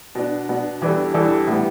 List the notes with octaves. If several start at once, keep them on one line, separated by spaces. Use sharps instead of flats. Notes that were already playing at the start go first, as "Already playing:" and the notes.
B2 B3 D4
B2 B3 D4
E2 E3 G3 D4 A4
E2 E3 G3 D4 A4
A2 G3 B3